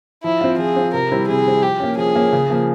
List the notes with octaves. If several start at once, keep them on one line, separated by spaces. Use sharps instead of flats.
F3 E4
C4 F4
F3 G#4
C4 F4
C3 A#4
G3 C4 E4
C3 G#4
G3 C4 E4
F3 G4
A#3 C#4
F3 G#4
A#3 C#4
C#3
F3 A#3